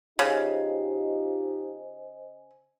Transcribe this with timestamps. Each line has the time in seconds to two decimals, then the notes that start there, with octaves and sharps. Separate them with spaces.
0.19 C#3 D#4 F4 G4 C5 D#5 G#5